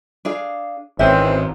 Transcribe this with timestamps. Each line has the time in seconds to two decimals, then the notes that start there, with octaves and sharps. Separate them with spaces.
0.25 D4 G#4 F5
0.99 G#1 E3 G#3 C4 C#4 E5